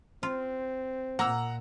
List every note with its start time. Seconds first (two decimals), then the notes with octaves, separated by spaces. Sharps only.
0.23 C4 F4
1.19 A#2 A#3 F#5 A#5 E6